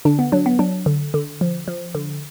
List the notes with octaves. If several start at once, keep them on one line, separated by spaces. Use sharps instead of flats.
D3 D4
B3
F#3 D4
B3
F#3 D4
D3
D3
F3
F3
D3